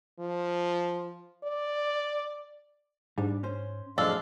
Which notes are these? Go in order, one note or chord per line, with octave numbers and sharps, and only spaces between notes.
F3
D5
G#2 G3 D4
C#4 C5
F2 A2 F3 F#3 G#3 D4 A4 F5